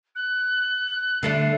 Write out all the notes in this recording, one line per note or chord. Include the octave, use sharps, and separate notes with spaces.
F#6
D3 A3 D4 C7